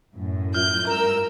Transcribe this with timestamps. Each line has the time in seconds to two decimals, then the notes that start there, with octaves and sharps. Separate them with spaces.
0.15 F#2 A2
0.55 F4 E5 G6
0.87 G2 A#4 A#5 E6